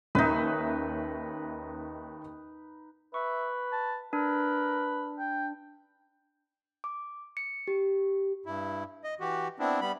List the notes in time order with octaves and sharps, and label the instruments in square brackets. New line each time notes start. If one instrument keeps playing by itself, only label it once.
[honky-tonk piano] D#2 C#4 E5 [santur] D#4 B4
[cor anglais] B4 [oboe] E5 [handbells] C#6
[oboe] A5
[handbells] D4 [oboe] A#4 [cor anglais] B4
[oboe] G5
[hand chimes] D6
C#7
G4
[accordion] G2 E4
D#5
E3 F#4 G4
B3 C4 D4 E4
G3 B3 B5